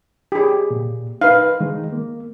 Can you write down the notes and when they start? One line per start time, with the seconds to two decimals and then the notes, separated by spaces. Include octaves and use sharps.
0.32 G4 G#4
0.71 A#2
1.21 D#4 B4 F5
1.60 D#3 G#3 D#4
1.92 A#3